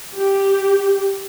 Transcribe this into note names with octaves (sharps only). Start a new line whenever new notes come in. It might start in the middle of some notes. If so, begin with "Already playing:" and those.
G4